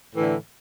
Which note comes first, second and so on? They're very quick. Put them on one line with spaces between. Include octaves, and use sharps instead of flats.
A2 E3 D3